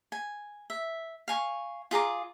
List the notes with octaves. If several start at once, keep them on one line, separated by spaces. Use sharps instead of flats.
G#5
E5
F5 G#5 C#6
F4 G#4 A#5 D6